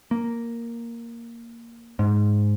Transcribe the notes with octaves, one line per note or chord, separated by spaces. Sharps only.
A#3
G#2